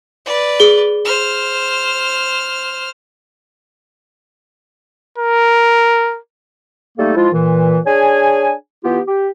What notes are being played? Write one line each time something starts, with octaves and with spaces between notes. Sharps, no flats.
B4 D5
G#4 G7
C5 F6
A#4
G3 A3 A#3 D#4 A4
F3 G#3 E4 F4
A#2 E3
D4 G#4 C#5 G#5
E3 B3 F4 G4
G4